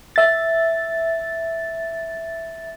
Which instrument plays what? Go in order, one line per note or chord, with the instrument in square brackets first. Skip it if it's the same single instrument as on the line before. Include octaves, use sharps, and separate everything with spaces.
[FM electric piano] E5 A6